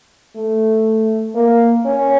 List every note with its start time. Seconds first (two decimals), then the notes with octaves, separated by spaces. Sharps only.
0.36 A3
1.35 A#3
1.86 C#4